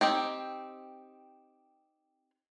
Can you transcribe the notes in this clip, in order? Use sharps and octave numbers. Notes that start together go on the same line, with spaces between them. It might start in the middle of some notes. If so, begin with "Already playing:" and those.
C4 D#4 G4